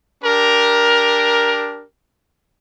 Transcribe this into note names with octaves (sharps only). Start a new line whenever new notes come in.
D4 G4 A#4